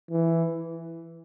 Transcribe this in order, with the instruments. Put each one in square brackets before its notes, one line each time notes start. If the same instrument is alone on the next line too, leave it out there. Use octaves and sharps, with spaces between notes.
[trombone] E3